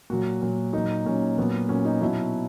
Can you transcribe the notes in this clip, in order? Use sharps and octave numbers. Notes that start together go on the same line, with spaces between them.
A#2 F#3 F#4
A#2 F#3
A#2 F#3 D#4
A#2 F#3 C#4
A#2 F#3 B3
A#2 F#3 C#4
D#4
B2 F#3 E4